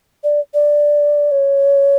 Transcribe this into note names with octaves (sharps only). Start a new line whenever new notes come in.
D5
D5
C#5